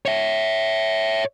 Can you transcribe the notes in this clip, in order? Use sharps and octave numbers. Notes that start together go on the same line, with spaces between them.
C#5 E5